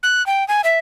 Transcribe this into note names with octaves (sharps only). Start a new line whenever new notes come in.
F#6
G5
G#5
E5